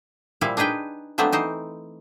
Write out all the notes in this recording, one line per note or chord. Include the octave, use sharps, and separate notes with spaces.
A#2 F3 G3 E4 F5
D4 D#4 G#4 B4 G5
F3 F#3 A3 B3 C4 D4
E3 D#4 C5